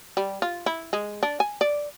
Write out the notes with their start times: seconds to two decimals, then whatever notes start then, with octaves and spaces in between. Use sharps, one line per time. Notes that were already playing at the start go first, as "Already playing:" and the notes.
0.17 G3
0.42 F4
0.66 E4
0.93 G#3
1.23 D4
1.40 G#5
1.61 D5